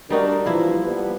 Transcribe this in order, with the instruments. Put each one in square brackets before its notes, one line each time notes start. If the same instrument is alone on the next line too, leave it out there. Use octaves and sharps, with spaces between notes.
[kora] G3 D#4 F#4 [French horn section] D4 A#4
[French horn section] G2 E3 F3 [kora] A#3 E4
[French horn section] F3 G3 B3